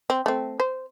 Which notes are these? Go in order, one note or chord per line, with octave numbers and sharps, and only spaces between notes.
C4
A3 C4
C5